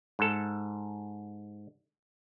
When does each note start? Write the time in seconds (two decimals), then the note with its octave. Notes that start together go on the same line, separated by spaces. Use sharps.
0.19 G#2 A4